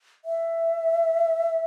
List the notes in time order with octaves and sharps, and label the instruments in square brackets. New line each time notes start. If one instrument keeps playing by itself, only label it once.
[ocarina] E5